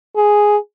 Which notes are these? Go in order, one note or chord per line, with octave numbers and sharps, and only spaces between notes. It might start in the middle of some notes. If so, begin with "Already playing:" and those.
G#4